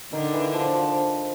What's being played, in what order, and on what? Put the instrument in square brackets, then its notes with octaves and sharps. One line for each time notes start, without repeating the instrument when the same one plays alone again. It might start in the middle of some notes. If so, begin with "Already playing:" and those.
[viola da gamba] D3 D4 [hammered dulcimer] D#3
[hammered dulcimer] E3
F3
F3